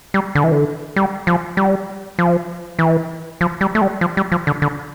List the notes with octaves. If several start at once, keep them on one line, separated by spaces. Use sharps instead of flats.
G3
D3
E3
D3
G3
F3
G3
F3
E3
F3
G3
A3
G3
F3
G3
F3
D3
D3